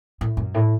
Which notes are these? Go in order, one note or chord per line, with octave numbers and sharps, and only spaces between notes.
A2
F#2
A2